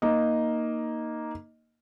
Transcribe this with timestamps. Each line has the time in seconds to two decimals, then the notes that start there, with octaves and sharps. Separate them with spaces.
0.02 A#3 D#4 D#5